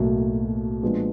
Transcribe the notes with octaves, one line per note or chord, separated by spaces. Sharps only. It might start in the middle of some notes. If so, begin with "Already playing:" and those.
Already playing: B1 A2 F#3 A#3
A#2 F3 G#3 B3 D4